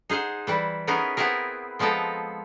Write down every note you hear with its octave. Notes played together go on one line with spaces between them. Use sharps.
D#4 G#4 C5 F#5
E3 G3 E4
B3 C#4 D#4 E4 G#4 A#4
B3 C4 E4 G#4 A#4
F3 G#3 B3 C4 A4 A#5